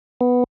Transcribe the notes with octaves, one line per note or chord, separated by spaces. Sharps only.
B3